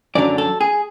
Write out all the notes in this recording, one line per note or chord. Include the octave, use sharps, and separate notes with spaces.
F#2 D3 F#3 D5
A4
G#4